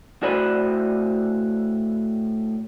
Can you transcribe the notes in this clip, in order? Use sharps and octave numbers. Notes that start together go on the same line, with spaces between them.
A2 F#4 C5 D5 G#5 B5